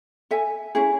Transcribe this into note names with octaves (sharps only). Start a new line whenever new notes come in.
A4 E5 G#5
C#4 E4 G#4